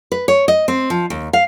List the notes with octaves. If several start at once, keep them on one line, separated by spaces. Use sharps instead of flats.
B4
C#5
D#5
C4
F3
D#2
F5